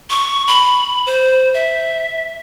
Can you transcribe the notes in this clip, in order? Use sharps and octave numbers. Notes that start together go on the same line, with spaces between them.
C#6
B5
C5
E5